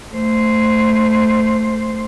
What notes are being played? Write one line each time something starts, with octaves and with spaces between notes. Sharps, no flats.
A3 C5